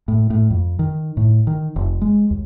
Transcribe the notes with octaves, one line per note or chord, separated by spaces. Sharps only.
A2
A2
F2
D#3
A2
D#3
F1
G#3
D#2